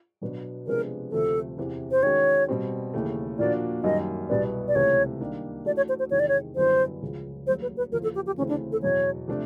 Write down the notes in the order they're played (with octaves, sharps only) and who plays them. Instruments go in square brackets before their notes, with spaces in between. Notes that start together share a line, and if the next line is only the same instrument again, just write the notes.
[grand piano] B2 F#3 B3 D4 F#4
[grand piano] C3 F3 G#3 B3 D4 [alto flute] A#4
[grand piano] D2 C3 F3 A3 [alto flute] A4
[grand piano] E2 C3 E3
[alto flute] C5
[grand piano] D#3 G#3 C#4 F#4 [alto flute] C#5
[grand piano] B2 G3 C4
D#2 C#3 E3 A3
[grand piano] A#2 F3 A#3 D4 F#4 [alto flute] D5
[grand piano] F#2 D#3 G3 A#3 D#4 [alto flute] D#5
[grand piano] C2 B2 G3 B3 [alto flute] D5
[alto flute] D5
[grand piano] C#2 C3 E3 A3 [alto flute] C#5
[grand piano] D#3 G3 A#3 D4
[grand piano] E3 A3 D4 F#4 [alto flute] D5
[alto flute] C#5
C5
C5
[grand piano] E2 C3 D#3 G#3 [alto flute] C#5
[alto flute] D5
C#5
[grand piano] F#2 D3 G3 B3 E4 [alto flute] C5
[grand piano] C#2 C#3 F3
[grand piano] D#2 C#3 F#3 A3 [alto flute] C5
[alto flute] B4
B4
[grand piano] E2 C#3 F3 A#3 [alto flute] A#4
[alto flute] A4
G4
G4
[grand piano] D2 C#3 E3 A3 C4 [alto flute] C#4
[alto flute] D4
A4
[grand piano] E2 B2 F#3 [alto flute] C#5
[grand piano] C3 F3 A3 D4